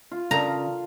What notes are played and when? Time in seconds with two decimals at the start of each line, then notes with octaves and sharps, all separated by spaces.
0.12 F4
0.31 C#3 D4 A4 A#4 A#5